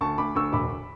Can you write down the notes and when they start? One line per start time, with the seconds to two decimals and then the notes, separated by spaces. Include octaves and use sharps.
0.01 D2 A5 C#6
0.18 D2 B5 D6
0.35 D2 C#6 E6
0.53 E1 B5 D6